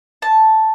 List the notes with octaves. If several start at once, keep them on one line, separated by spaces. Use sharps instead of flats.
A5